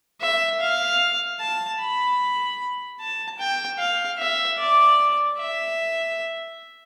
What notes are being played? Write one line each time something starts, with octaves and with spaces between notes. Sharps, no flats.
E5
F5
A5
B5
A5
G5
F5
E5
D5
E5